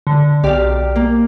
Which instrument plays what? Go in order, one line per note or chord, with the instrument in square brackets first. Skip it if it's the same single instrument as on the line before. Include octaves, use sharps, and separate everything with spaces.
[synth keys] D3
[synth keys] B1 D5 [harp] G4 F5
[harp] A#3